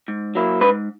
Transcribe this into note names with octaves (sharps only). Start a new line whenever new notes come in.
G#2
F#3 A#3 E4
G#2 B4